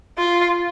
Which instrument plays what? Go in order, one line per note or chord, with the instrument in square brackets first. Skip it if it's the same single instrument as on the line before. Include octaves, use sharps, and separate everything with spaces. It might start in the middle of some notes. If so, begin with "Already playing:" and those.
[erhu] F4